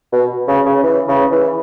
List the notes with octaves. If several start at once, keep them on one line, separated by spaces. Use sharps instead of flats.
B2
C#3
C#3
E3
C#3
E3